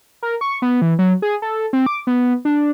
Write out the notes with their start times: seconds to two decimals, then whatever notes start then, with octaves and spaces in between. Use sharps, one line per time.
0.23 A#4
0.41 C#6
0.62 B3
0.82 E3
0.99 F#3
1.22 G#4
1.42 A4
1.73 C4
1.86 D6
2.07 B3
2.45 D4